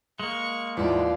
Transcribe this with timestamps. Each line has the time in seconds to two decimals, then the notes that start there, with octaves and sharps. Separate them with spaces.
0.20 G#3 A#3 C#6
0.77 D#2 G#2 E3 F3 B3 E4 F4 D5